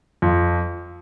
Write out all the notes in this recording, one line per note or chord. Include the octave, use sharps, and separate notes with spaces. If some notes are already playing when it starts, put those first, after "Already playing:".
F2